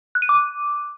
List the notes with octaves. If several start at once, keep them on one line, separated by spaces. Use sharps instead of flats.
F#6
D#7
D6